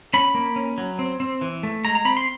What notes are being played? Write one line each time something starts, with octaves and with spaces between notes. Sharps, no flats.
C#4 B5
A#3
C#4
F#3
C4
C4
E3
A3
G#3 A#5
A#5
C4 B5
C6